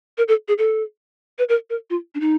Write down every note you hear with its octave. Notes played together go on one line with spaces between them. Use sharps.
A#4
A4
G#4
A4
B4
A#4
A#4
F4
D4
D#4